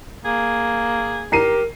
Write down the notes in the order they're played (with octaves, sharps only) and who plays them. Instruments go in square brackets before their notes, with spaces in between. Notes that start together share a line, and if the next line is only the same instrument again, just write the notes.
[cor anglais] A#3 [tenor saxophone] G#4
[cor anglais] G4 [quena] A#4 [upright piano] A#5 C7 D#7